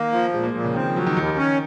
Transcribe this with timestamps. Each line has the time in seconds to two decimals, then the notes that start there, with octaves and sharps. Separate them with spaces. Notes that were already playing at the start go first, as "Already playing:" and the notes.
Already playing: D#3 A#3
0.12 F3
0.34 A#2 G#3
0.43 A#3
0.54 A#2 F3
0.64 C#3
0.74 D#3 C4
0.86 F3
0.96 F3 F#3
1.06 D#3
1.17 D#2 D#3
1.37 C#4